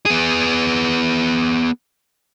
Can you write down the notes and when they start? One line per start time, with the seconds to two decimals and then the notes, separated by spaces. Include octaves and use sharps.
0.06 B3 G#4